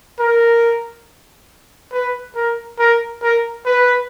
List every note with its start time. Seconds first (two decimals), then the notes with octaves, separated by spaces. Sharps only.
0.19 A#4
1.92 B4
2.35 A#4
2.79 A#4
3.23 A#4
3.65 B4